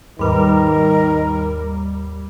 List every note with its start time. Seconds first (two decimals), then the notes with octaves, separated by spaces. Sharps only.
0.19 D#2 G#2 D#3 G3 A#4 B4